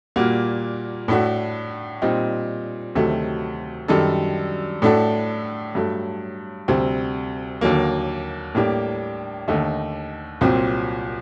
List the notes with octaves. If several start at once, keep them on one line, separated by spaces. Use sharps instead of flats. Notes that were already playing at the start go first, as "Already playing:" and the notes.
A#2 G3 A#3 F#4
A2 A3 D4 F#4
A#2 G3 C4 D#4
D2 C3 D#3 F#3 A3
F#2 D#3 G3 D4 A4
A2 A3 D4 F#4 A4
G2 F#3 A3
D2 C3 G3 C4
D#2 D3 F#3 A#3
A2 G3 A#3 D4 G4
D#2 D3 A3 D#4
C2 A#2 F#3 C4